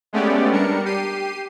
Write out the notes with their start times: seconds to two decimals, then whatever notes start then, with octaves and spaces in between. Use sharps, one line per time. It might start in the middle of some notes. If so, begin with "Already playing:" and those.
0.13 G#3 A3 B3 C#4 G4 D5
0.52 G3 D4 A#4 C#7
0.85 G4 C7 D#7